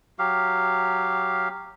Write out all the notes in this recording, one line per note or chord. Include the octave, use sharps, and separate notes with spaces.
F#3 G4 F5